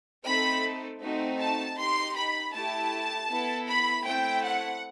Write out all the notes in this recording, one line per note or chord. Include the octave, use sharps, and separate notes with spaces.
A3 C4 D#4 A4 B5
A3 C4 D#4 F#4
A5
D#4 G4 C6
B5
A3 E4 G4 A5
B3 E4 A4
B5
A3 C4 E4 G5
F#5